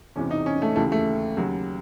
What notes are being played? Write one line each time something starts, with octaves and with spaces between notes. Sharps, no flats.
E1 E2 C3 E3 C#4
D#4
C#4
A3
D#2 C#3 E3 A3
A3
D#2 C#3 F#3